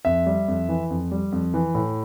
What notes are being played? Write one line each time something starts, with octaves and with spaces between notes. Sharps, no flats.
F2 E5
G3
F2
E3
F2
G3
F2
E3
A2